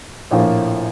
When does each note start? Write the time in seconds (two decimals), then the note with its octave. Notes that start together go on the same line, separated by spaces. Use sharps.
0.31 A#1 A2 F3 A#3 F4